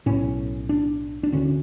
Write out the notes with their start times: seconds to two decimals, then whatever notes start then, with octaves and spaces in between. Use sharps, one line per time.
0.06 B1 A2 C#4
0.69 D4
1.23 D4
1.32 D2 D3 C#4